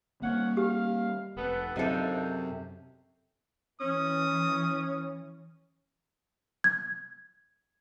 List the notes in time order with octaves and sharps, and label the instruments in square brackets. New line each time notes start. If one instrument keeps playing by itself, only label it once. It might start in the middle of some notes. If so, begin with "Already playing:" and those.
[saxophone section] F3 C#4 F#5 [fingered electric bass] G3 A3 A#3
[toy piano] G4 [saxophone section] F5
[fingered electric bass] F1 [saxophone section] B3 A4
[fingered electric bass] F#2 [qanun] C3 A4 [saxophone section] F3 D4 D#4
[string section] E3 [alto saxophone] C#4 [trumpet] D#6
[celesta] G#6